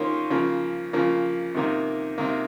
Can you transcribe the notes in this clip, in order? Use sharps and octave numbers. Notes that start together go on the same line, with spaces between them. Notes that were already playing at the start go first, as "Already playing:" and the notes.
Already playing: D#3 A#3 C#4 F4 C5
C#3 F3 A#3
C#3 F3 A#3
C3 D#3 A#3
C3 D#3 A#3